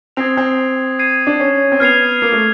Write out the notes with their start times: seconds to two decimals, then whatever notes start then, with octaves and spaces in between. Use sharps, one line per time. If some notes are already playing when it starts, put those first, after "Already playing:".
0.17 C4 D#6 G#6 C7 F7
0.37 C4
0.99 G#6 C7 D#7
1.27 D4
1.40 C#4
1.72 C4
1.80 B3 F6 G#6 C7 F7
2.22 A#3
2.32 A3